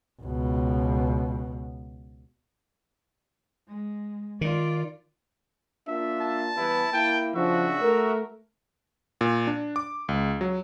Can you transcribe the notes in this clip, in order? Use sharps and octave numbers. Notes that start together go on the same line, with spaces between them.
C#2 B2
G#3
D#3 F4 D5
A#3 D4 F4 E5
A5
E3 G3 B3 E4
A#3 E4 G5
C#3 F3 D4 F#4 E5
A3 A#4
A#2
D4
D6
C#2
F#3